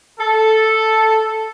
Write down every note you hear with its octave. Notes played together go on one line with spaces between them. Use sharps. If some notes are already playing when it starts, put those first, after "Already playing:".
A4